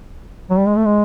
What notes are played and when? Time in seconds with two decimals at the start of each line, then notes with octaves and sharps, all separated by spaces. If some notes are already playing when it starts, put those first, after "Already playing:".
0.50 F#3
0.58 G3
0.67 G#3
0.77 A3
0.85 G#3